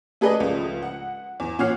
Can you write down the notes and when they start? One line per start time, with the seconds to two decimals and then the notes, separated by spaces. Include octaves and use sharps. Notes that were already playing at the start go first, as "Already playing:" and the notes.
0.21 A3 G#4 A4 B4 D5 D#5
0.40 C#2 F3
0.83 F#5
1.40 E2
1.59 A#2 C#5 F#5 F6 C7